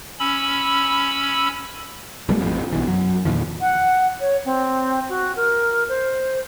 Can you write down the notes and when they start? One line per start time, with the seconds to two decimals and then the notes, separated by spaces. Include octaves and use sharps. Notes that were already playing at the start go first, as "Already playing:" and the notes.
0.20 C#4 B5 E6
2.29 B1 G3 A3
2.41 A1 F2
2.73 B1 B2 E3
2.87 F#2 F#3
3.25 E2 A#2 D#3 F3
3.61 F#5
4.20 C#5
4.45 C4
5.09 F#4
5.36 A#4
5.89 C5